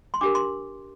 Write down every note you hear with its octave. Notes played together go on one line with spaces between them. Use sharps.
C6
D4 G4 A#4 D6
C6